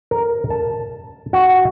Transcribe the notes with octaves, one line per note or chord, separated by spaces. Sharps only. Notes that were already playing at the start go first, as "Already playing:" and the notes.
A#4
A5
F#4